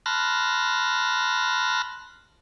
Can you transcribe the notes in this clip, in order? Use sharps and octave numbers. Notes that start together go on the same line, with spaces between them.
A5 B5 C6 F6 F#6 A#6